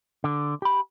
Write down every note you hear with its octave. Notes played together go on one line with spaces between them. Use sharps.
D3
G4 B5